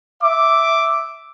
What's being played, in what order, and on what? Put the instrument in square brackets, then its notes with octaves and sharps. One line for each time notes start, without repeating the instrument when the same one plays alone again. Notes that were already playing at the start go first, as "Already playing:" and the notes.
[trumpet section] E5 D6